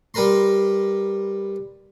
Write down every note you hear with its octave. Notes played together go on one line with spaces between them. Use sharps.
G3 A#4 B4 A#5 C6